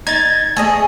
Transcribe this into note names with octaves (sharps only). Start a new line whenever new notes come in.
D#4 G#6 A6
A3 G#4 D#5